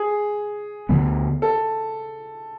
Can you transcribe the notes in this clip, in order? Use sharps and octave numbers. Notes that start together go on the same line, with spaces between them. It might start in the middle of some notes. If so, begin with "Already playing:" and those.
Already playing: G#4
D2 D3 G#3 B3
A4